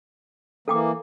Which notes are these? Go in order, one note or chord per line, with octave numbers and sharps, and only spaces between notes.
E3 A#3 A4 G5 D6